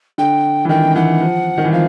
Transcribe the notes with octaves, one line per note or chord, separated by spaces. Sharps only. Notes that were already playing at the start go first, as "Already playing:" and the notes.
D3 G5
E3
D#3 G5
E3 F#5
F3
D#3
E3
F3 F5